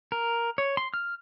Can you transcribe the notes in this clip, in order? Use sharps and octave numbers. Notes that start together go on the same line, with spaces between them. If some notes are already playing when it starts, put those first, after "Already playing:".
A#4
C#5
C6
F6